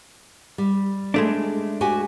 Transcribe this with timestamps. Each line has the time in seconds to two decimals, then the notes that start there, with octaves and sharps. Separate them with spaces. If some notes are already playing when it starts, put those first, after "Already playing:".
0.58 G3
1.14 G#3 A3 D4
1.81 F#4 G4 G#5